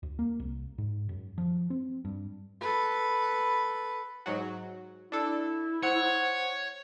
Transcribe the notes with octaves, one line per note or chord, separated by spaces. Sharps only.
D2
A#3
C2
G#2
F#2
F3
C4
G2
A4 B4
G#2 F#3 F#4
D4 E4 A4
C5 C#5 F#5 C#7